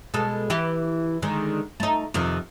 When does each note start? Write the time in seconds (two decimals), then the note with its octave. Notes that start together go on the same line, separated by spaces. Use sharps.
0.14 B2 G#3 A4
0.50 E3 E4 G4
1.22 D3 D#3 G#3
1.80 A3 D#4
2.14 F2 C3 D#3